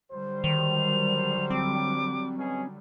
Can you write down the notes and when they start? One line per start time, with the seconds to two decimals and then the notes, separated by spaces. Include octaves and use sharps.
0.12 D3 F#3 G3 C5
0.44 D#3 F7
1.50 C4 D6
2.38 B2 C#4 G#4